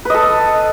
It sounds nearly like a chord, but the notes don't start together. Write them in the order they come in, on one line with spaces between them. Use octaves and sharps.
B4 D#5 A4